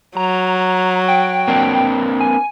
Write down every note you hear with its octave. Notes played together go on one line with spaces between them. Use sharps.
F#3 A#5
G5
A#3 C4 D4
G#5